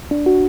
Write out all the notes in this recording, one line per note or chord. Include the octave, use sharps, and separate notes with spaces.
D4
F#4